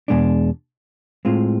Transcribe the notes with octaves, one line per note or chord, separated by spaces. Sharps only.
E2 B2 G#3 D4
A2 G#3 C4 F4